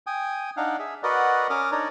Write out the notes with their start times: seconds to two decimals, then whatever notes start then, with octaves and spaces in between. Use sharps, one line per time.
0.07 G5 G#5 D#6
0.57 D4 D#4 F5 F#5
0.79 G#4 E5
1.03 F#4 A#4 B4 D5 D#5 F#5
1.50 C#4 A#4 D6 D#6 F6
1.71 D4 D#4 A#4 C#5 D5 A#5